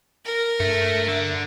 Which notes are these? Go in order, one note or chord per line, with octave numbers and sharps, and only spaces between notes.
A#4
G2 A3
D3